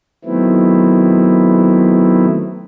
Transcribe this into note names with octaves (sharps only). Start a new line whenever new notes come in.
D#3 F#3 A3 B3 C4 E4